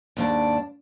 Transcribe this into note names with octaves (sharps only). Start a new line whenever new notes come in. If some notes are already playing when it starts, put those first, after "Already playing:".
D#2 G#2 D4